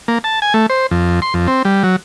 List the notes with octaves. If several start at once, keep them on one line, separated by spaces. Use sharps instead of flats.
A#3
A5
G#5
A3
C5
F2
C6
F2
C4
G3
F#3